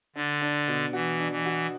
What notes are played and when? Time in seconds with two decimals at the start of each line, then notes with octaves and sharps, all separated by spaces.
0.16 D3 D4
0.41 D4
0.68 B2
0.93 E3 F#4
1.19 D4
1.32 E3
1.45 F#4